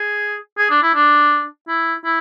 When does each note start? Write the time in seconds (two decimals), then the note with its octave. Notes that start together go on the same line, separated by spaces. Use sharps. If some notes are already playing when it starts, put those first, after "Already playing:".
Already playing: G#4
0.58 G#4
0.70 D4
0.83 E4
0.94 D4
1.68 E4
2.05 E4